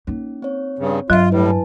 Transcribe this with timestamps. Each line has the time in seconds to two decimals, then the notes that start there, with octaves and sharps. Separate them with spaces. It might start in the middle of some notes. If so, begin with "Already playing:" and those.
0.07 A#3 C#4 D#4
0.42 C4 C#5
0.79 G2 C#3
1.10 G2 F#3 F4 E5
1.31 A2 G3 E4 B4
1.46 G#5 A5